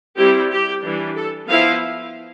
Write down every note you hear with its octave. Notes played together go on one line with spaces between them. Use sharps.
G3 C4 E4 G4
G4
E3 G3 D4
A4
F3 B3 E4 F5